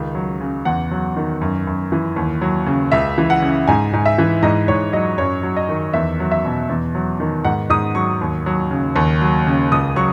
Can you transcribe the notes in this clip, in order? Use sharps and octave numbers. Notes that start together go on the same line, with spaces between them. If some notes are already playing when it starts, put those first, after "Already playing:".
Already playing: C#2 D#3
F#3
C#3
E2 F#5
F#3
D#3
F#2
F#2
E3
D#2
F#3
C#3
C#2 E5
E3
F#5
C#3
G#2 G#5
G#2
E5
E3
G#2 D#5
G#2 C#5
F#3 D#5
F#2 C#5
F#3
D#5
D#3
E2 E5
F#3
E5
B2
E2
F#3
D#3
G#2 F#5
G#2 D#6
F#3 C#6
D#2
F#3
C#3
D#2
F#3
C#3
C#2 D#6
F#3 C#6